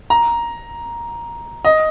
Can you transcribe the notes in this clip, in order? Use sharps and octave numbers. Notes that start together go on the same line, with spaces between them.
A#5
D#5